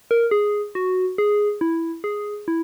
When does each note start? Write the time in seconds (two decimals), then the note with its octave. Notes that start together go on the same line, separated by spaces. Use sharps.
0.11 A#4
0.31 G#4
0.75 F#4
1.18 G#4
1.61 E4
2.04 G#4
2.48 E4